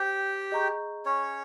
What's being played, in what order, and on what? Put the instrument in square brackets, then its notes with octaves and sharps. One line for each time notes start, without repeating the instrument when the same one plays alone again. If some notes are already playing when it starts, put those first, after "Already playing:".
Already playing: [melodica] G4 G5 [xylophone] C5
[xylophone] G#4 D#5 A#5 C#6 G6
[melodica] C#4 C#5